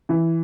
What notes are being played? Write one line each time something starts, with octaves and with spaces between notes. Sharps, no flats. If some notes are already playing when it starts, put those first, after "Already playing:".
E3